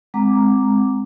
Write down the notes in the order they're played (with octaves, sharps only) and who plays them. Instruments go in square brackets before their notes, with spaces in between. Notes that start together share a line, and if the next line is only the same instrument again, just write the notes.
[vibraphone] G#3 C4 F#5 A#5 D6